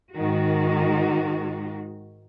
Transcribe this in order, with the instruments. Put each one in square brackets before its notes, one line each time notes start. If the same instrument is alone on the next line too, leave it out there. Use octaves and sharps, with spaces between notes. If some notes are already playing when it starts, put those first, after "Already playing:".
[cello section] G#2 D#3 F#4